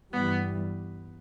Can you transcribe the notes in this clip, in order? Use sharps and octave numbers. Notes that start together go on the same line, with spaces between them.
G2 E3 G3 B3